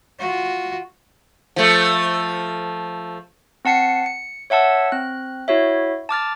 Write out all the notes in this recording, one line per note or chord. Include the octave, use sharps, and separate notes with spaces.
F4 F#4
F3 A3
C4 F#5 A5 C7 C#7
C#7
C#5 E5 F#5 A5 E6
C4 F#6
E4 F#4 C#5 E5
A5 D6 F6 A6